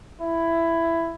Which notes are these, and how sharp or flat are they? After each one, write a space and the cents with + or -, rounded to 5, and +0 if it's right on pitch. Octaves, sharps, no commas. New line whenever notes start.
E4 +10